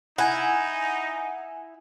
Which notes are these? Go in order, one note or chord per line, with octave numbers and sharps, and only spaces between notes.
D#4 E4 F#5 G#5